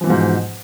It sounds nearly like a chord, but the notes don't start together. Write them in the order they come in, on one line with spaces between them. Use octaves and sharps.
F3 E3 B2 G#2